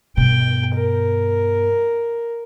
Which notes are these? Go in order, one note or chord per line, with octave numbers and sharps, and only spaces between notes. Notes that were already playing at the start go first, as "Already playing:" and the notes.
G2 B2 G5
A#4